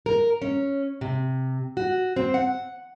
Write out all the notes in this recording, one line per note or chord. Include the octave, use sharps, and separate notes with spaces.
A#4
C#4
C3
F#4
C4
F#5